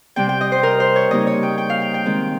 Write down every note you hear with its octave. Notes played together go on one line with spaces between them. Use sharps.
C3 G3 C4 G5
G5
D#5
C5
A#4
C5
C#5
C#3 G3 A#3 D#4 D#5
C#5
G5
G5
F5
G5
G5
D#3 G#3 C4